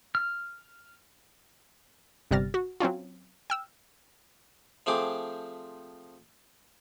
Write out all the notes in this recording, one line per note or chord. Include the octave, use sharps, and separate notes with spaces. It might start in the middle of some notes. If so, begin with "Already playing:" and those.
F6
G1 C3 G3 F6 A6 A#6
F#4
F#3 C4 C#4 F4
G5 E6 F6
F3 A3 C4 G#4 D6